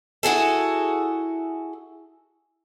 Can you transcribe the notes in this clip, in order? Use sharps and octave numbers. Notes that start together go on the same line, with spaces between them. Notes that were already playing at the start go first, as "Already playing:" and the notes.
E4 F#4 G#4 A4